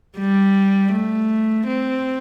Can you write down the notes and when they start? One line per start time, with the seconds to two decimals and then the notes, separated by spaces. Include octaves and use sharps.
0.18 G3
0.93 A3
1.67 C4